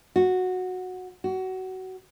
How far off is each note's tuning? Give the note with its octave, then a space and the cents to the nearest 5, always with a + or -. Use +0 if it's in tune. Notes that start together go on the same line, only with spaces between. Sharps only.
F#4 -10
F#4 +20